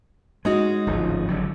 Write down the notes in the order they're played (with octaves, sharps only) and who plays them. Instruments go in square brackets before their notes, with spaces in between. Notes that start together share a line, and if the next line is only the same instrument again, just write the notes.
[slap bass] G#3 [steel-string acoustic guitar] C#4 D#4 F#4
[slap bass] D1 G#1 F3
G#1 D3 F#3